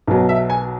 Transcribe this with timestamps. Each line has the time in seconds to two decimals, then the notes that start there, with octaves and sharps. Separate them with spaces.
0.08 B1 B2 F#3
0.29 E5
0.50 G#5